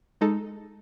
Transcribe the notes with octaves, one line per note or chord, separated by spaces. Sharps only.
G#3 D#4 A4